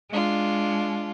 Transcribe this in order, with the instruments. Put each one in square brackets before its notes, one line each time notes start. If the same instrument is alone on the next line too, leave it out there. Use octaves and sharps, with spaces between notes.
[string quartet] G#3 D4 F4